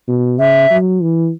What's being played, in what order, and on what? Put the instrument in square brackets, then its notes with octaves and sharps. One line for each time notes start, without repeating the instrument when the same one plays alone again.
[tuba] B2
[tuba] C#3 [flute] E5
[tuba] F#3
E3